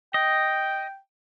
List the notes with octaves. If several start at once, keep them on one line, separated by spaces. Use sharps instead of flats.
D#5 G5